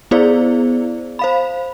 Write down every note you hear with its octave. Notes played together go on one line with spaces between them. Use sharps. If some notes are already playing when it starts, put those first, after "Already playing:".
B3 E4 G#4 C5 D5
C5 F5 B5